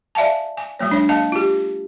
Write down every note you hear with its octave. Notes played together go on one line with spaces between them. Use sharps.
D5 E5 F5 G#5 A5
G#5
F#3 G#3 A#3 C#5
D4 C#5
A#3 D#5 F5 A5
F4 G4